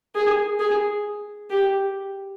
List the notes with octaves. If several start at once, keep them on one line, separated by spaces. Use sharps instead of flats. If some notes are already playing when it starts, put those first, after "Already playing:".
G#4
G#4
G4